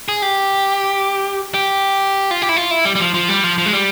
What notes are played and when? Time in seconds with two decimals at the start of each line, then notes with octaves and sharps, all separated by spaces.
0.09 G#4
0.22 G4
1.54 G4
2.31 F4
2.42 G4
2.49 E4
2.56 F4
2.71 E4
2.85 G3
2.95 G3
3.00 F3
3.14 F3
3.29 G3
3.44 F3
3.58 F3
3.66 G#3
3.73 G3